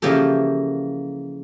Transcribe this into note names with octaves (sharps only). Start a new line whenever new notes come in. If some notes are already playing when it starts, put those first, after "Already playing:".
C#3 E3 F3 A#3 G4 A4